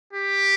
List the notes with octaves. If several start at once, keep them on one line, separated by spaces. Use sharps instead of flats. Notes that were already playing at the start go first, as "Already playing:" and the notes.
G4